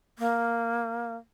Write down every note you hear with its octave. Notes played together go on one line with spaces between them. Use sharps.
A#3